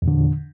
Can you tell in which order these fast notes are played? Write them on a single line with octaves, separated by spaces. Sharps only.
E2 A#2 D3